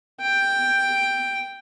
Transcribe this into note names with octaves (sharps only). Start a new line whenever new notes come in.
G5